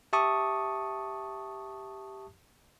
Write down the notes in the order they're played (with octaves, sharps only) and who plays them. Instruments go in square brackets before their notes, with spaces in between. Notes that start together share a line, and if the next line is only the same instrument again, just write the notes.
[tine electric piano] G4 E5 A5 C#6 D#6